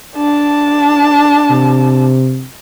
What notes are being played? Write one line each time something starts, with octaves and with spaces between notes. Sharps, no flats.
D4 A5
C3